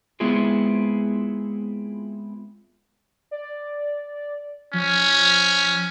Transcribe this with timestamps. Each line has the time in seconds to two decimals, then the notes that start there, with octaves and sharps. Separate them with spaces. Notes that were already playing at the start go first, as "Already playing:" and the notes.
0.20 G#3 B3 C4 E4 F4 G#4
3.31 D5
4.73 F3 C#4